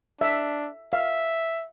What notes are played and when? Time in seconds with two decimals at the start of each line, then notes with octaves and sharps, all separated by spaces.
0.21 D4 E5
0.93 E5 F5